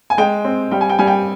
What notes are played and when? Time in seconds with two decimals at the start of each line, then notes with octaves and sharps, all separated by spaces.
0.10 G#5
0.18 G#3 G5
0.44 C4
0.71 G3 G5
0.81 G#5
0.89 G5
0.99 G3 G#5
1.07 G5